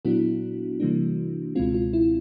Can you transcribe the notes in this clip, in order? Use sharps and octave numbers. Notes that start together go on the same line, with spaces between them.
A#2 F#3 B3 D4 E4 F#4
C3 E3 G3 A#3 D4
C#2 B2 G#3 C4 F4
F4
E4